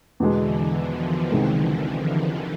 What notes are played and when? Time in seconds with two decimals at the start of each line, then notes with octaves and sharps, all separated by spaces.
0.19 E2 B2 D3 E3 G#3
0.75 D#3 F3
1.31 C2 C3 D#3 G#3